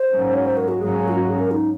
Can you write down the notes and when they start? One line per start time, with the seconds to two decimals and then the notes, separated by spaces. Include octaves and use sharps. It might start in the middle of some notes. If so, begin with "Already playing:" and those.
Already playing: C5
0.09 G#2 F#3 A#3 C#4
0.34 C#5
0.45 C5
0.57 A#4
0.68 F#4
0.80 G#2 F#3 A#3 C#4 G#4
1.08 F4
1.15 F#4
1.28 G#4
1.39 A#4
1.51 D#4